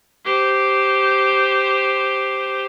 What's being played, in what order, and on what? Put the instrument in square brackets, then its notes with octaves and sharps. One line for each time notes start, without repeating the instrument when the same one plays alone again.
[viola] G4 C5